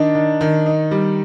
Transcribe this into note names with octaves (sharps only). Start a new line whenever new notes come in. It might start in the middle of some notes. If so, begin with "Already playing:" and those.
Already playing: D#3 D4 D#4 D5
D#3
D#3
D#4
G3